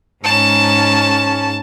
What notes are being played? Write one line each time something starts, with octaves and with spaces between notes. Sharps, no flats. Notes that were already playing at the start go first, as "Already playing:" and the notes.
G#2 G#3 C#4 A5